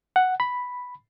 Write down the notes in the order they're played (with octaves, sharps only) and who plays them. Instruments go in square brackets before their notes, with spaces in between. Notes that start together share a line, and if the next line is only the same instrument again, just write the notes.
[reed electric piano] F#5
B5